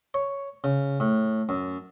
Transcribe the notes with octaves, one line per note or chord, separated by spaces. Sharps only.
C#5
C#3
A2
F#2